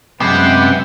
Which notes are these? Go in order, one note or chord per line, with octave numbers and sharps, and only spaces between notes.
F#2 C3 G#3 B3 B4 F#5 G5